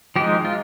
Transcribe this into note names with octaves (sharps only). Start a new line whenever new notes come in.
F3 G#3 D#4 G4
F4